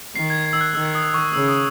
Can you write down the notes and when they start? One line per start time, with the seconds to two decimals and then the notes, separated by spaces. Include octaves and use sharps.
0.15 D#3 C7
0.30 G#6
0.45 G#6
0.53 E6
0.61 F#6
0.75 D#3 E6
0.95 D#6
1.14 C#6
1.33 C#3 E6
1.48 D#6